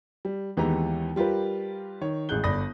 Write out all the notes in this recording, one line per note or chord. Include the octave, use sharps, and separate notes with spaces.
G3
D#2 E3 G#3 B3 G4 A#5
G3 F4 G4 A#4 B4
D#3 C#5
A1 G#3 G#4 F#6 G6 G7
G1 D5 B5 D#6 A#6